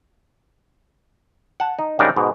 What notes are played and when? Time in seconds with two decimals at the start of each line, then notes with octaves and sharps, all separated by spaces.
1.60 F#5 A5
1.79 D#4
1.99 G#2 C#3 G3 D4 D#4 A#4
2.16 G#2 B2